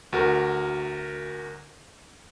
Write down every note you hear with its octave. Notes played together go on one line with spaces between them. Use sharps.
D2 F#4 A#4